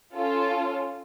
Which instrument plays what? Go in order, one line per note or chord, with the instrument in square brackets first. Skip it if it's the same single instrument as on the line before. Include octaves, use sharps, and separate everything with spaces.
[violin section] C#4 F4 A4